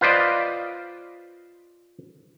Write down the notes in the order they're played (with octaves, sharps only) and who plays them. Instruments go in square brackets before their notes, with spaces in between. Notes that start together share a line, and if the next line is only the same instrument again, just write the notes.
[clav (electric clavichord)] F4 B4 C5 D5 D#5